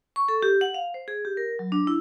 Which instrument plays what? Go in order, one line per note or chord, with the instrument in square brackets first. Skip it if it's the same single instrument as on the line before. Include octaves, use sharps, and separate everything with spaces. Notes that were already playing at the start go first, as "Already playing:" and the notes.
[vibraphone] C#6
A4
G4
F#5
F5
C5
G#4
G4
A#4
F#3
D4
E4